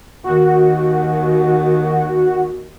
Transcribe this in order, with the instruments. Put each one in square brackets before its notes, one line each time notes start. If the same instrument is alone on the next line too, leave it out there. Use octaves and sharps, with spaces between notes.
[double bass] D#2 D#3 [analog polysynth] F#4